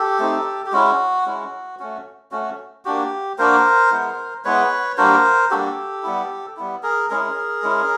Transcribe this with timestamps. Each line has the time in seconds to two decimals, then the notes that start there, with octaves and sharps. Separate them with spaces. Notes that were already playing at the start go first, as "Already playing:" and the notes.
Already playing: G4 A4
0.20 A3 C4 D#4
0.66 G4
0.72 G#3 C#4 E4 F#4
1.26 G#3 C#4 E4
1.79 A3 C#4 F#4
2.31 A3 C#4 F#4
2.85 A#3 D4 F#4 G4
3.38 A#3 D4 F#4 A#4 C5
3.91 G#3 B3 E4
4.44 G#3 B3 E4 B4 C#5
4.97 G3 A#3 D4 F#4 A#4 C5
5.50 G3 A#3 D4 F#4 G4 A4
6.03 G3 B3 E4
6.57 G3 B3 E4
6.83 G#4 A#4
7.10 G#3 C#4 E4 G#4 A#4
7.63 G#3 C#4 E4